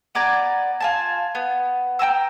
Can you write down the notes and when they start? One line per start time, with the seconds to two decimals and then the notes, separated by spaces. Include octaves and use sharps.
0.15 B3 D5 G#5 A#5
0.80 F4 G#5 A5
1.35 B3
1.99 G5 G#5 A#5 E6